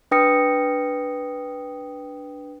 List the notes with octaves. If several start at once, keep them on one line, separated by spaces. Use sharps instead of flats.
D4 B4 G5 D#6 A#6 C#7